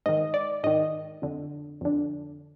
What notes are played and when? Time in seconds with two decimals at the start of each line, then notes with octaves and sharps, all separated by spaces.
0.06 G#2 D#3 D#5
0.34 D5
0.64 G#2 D#3 D#5
1.22 F2 D3
1.81 F2 D3